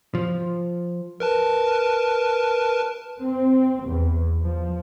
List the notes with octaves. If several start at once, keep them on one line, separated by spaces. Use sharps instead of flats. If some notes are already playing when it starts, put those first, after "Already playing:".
F3
A#4 B4 A5
C4
E2
F3